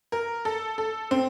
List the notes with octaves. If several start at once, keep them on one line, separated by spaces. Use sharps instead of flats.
A#4
A4
A4
C4